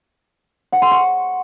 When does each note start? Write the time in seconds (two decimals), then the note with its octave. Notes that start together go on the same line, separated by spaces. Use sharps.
0.72 F#5
0.82 C6
0.91 C#6